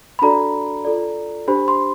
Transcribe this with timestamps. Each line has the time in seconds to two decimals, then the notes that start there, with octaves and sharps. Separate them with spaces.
0.19 B5
0.22 D4 F#4 A4 D5 A#5
0.85 F4 A4 D5
1.48 D4 G4 C5 B5
1.68 C6